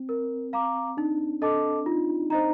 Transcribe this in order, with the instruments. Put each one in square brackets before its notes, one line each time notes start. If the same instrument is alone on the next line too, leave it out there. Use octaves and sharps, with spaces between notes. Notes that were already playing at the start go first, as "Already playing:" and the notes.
Already playing: [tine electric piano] C4
[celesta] A#4
F5 A#5 D6
[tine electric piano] D4 [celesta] D#4
[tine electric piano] D4 [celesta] A4 D#5 A5 D6
[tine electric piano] D#4 [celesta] F4
[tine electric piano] D#4 [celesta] C5 D#5 A#5